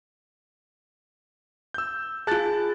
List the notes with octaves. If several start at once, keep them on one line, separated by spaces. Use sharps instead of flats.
E6 G6
F4 G#4 A5 F#6 A6